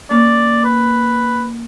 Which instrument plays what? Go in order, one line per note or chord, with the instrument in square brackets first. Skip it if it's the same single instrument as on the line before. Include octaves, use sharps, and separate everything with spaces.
[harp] A#3 C#4 [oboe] D5
[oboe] B4